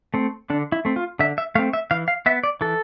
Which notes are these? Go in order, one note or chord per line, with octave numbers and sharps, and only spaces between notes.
A3 C4
D3 D4
E4
A3 C4
F4
D3 E5
E5
A3 C4 F5
E5
E3 F5
F5
B3 E5
D5
E3 A4